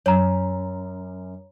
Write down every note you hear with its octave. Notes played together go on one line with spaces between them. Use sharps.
F#2 C#5 A#5